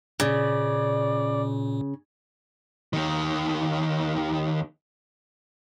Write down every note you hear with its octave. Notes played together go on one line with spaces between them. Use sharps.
A#2 C#3 D5
D#2 D#3